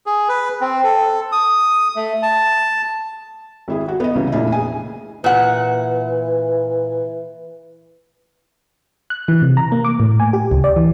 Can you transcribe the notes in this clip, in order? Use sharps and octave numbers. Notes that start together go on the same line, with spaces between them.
G#4
B4
C4
A4
D#6
A3
A5
G#1 E4 G#4
F#4
B3 D#5
C2 C#3 E3
F1 A#2 D4 E4
G#4 G#5
A#2 E3 F#5
F#6
E3
C3
A#5
A#3
D6
A2
G#5
G4
C#2
D5
E3